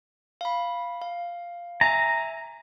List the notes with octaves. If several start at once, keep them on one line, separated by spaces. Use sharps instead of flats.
F5 B5
F5
E5 G#5 A#5